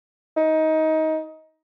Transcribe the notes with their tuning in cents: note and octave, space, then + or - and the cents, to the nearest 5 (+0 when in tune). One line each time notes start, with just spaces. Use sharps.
D#4 +20